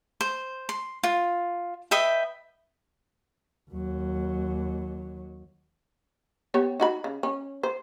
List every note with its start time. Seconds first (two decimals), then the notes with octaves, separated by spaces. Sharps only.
0.21 C5
0.69 C6
1.03 F4
1.91 B4 D#5 E5 G5
3.71 D#2 F#3
6.54 B3 G4 C#5
6.80 D#4 F#4 B5
7.04 C#3
7.23 C#4
7.63 C5